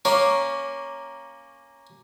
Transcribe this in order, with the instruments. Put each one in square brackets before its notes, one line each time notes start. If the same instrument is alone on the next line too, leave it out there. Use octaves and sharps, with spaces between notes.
[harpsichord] A#3 C#4 [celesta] C#6 D6